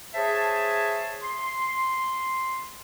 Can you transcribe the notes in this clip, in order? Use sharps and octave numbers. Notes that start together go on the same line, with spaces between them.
G#4 C5 C#5 E5 A5
C6